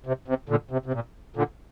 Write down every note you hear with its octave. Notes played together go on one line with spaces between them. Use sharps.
C3
C3
A#2 D3
C3
C3
A#2
A#2 D3